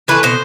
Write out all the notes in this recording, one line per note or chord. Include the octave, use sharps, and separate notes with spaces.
E3 A3 B4
B2 C5